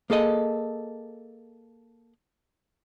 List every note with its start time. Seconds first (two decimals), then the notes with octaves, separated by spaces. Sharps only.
0.10 A#3 G#4 A4 D#5